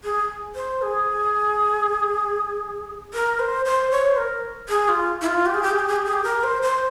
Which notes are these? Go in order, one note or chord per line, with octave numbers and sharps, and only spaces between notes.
G#4
C5
G#4
A#4
C5
C5
C#5
C5
A#4
G#4
F4
E4
F4
G4
G#4
G4
G#4
G4
G#4
G4
G#4
G4
A#4
C5
C5